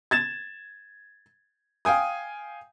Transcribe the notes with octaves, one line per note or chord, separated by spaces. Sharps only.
G#6 A6 E7
F5 G5 G#5 D#6